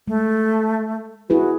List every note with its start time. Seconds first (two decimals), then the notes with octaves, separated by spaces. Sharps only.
0.08 G#3 A3
1.30 E4 F#4 G#4 B4